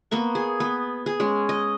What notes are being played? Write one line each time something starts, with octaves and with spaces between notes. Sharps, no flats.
A#3 B3 A#4 C#6
G#4
B3
G#4
G#3 C#4
D#5